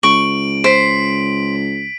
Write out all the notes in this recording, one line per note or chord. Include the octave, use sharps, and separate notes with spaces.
C#2 C#6 D7 F#7
C5 B6 D7